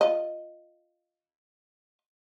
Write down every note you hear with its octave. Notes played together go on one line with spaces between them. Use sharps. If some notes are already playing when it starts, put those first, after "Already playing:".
F4 D#5